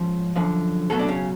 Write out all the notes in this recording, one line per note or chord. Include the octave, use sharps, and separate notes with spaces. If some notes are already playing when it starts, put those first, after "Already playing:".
Already playing: G#2 F3 C#4 C#5
F#2 D3 F3
B1 B2 F#3 A3 A4
D4
C#3 C#4